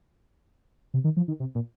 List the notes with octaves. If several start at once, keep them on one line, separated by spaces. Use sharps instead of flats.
C3
D#3
F3
D#3
C3
A#2